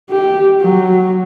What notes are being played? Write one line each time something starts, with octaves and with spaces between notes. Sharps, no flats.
G4
F#3